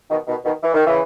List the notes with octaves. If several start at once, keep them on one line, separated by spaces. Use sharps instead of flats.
B2 D#3
B2 D#3
B2 D#3
E3
D#3
C#3 E3